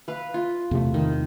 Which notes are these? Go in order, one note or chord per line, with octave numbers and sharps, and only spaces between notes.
B4 F5
F4
E2 C3 A3
D#3